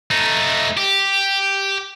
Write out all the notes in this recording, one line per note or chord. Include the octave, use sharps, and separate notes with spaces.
A3 D#4
G4